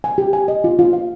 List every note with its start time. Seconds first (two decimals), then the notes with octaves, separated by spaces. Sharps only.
0.04 G#5
0.18 G4
0.33 G#5
0.48 D#5
0.64 F4
0.79 F4
0.93 F5